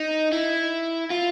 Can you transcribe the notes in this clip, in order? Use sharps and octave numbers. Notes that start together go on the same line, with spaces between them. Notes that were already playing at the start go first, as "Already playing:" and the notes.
Already playing: D#4
E4
F4